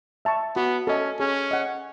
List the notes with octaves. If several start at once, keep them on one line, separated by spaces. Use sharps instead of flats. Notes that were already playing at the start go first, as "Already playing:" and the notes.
E5 A5 C#6
B3 F#4
C#4 A4 D#5 A5
C#4 G#4
D#5 F#5